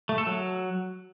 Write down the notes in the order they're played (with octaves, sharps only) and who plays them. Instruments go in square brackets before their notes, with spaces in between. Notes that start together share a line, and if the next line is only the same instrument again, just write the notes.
[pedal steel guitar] A3
A4
F#3